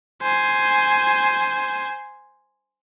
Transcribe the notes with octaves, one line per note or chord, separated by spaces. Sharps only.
C5 G#5